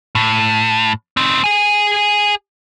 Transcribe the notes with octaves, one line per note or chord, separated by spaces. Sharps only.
A2
C4 D#4
G#4 G#5